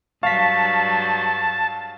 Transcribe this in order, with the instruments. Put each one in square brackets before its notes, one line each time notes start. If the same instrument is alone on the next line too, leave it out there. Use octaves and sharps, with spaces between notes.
[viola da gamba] G2 F#3 [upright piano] F5 [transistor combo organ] A5 [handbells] C#6 B6